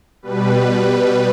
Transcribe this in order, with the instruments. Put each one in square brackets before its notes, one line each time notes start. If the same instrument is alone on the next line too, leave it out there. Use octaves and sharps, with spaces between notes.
[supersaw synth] B2 G3 B4